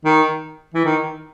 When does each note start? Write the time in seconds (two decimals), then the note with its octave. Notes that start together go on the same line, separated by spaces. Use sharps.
0.05 D#3
0.74 E3
0.85 D#3